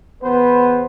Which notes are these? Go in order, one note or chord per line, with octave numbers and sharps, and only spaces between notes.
E2 B3 B4 C5